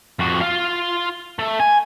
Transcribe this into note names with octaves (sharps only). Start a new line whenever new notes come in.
F2 F#4
F4 F5
A3
G#5